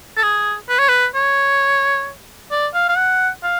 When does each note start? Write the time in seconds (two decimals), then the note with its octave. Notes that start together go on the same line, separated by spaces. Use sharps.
0.17 A4
0.23 G#4
0.69 B4
0.79 C#5
0.89 B4
1.15 C#5
2.51 D5
2.74 F5
2.89 F5
2.97 F#5
3.43 F5